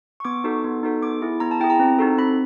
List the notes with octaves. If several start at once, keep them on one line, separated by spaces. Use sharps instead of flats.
C#6
B3 D6
D#4 F#4 A4
B3
D#4 F#4 A4
B3 D6
E4 G#4
B3 A#5
A5
E4 G#4 G5
A#5
C4
D#4 F#4 A4
C4 B5